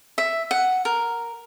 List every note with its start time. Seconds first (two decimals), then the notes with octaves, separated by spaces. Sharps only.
0.18 E5
0.51 F#5
0.85 A#4